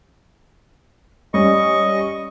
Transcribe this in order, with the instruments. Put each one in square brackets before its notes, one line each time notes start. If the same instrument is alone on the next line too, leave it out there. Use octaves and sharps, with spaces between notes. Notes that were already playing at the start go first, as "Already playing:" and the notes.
[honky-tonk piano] G3 C#4 [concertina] D#5 C#6